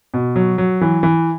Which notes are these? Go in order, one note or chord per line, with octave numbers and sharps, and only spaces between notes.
B2
F#3
F#3
E3
E3